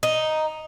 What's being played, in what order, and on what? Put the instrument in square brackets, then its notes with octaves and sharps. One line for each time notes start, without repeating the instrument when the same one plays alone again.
[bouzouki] D#4